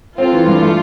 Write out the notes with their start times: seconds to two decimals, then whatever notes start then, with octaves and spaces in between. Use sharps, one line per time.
0.17 C4 F4 A4
0.32 E3
0.46 G2
0.62 A3